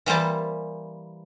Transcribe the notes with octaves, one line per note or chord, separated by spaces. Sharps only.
E3 G3 A#3 C5 A5